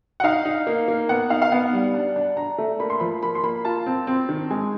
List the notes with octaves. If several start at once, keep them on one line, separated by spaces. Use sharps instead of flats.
F#5
D#4 F5
D#4
A#3
A#3
B3 F#5
D#4 F5
F5
B3 F#5
G3
D4
D4
D4 A#5
A3
A#3 B5
C6
F3 B5
A#3 B5
C6
A#3 B5
F4 A5
C4
C4
D#3
G#3 G#5